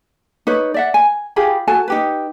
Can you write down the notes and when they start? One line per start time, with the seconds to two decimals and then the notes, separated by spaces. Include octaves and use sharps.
0.47 D#4 B4 C#5
0.74 D5 E5 F#5
0.94 G#5
1.36 F4 G4 G#4 B5
1.67 F#4 A4 G#5 A5
1.88 D#4 G4 B4